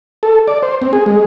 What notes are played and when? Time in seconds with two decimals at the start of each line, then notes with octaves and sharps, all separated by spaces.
0.23 A4
0.48 D5
0.63 C5
0.82 C4
0.93 G#4
1.06 G#3